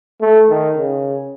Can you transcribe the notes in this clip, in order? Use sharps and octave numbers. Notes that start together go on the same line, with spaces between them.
A3
D#3
C#3